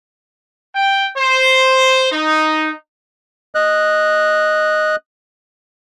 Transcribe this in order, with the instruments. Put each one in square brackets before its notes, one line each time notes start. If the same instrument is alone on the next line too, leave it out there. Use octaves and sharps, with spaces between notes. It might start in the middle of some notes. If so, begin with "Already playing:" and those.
[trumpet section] G5
C5
D#4
[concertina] D#5 F#6